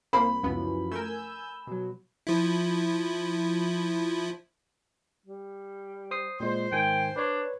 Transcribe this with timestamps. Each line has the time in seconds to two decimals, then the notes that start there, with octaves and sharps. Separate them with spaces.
0.13 C2 A#3 C5 B5
0.43 C#2 F#2 E3 F3 B3
0.91 A3 A#4 G#5 E6 G6
1.67 B2 F#3
2.27 F3 E4
5.26 G3
6.11 C5 D#6 C7
6.40 A#2 G#3 C5
6.72 G#2 D#3 G5 G#5
7.16 D4 B4 C#5